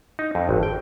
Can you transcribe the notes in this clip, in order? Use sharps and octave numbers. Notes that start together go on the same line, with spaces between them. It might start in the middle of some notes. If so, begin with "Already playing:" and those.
D#4
F2
G#1
G5